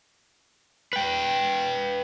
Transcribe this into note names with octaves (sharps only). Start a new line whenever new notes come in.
B4 G5